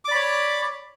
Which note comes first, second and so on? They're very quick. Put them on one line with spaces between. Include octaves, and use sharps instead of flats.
D6 D5 B5 C#5